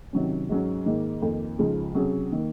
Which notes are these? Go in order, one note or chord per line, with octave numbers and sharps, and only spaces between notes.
C3 D#3 F#3 C#4
G#2 F#3 C#4
G#2 D#3 A#3
F2 D#3 A#3
C#2 C#3 F3 G#3 D#4
C3 F#3 C#4 G#4
D#3 A#3